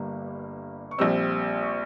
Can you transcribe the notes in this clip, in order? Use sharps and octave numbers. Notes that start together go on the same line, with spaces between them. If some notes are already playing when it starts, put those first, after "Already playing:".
Already playing: G1 G2 G3 A#3
C#6
A#1 A#2 G3 C4 E6
C#6